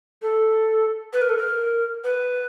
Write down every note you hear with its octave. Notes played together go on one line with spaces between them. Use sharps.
A4
B4
A#4
A4
A#4
B4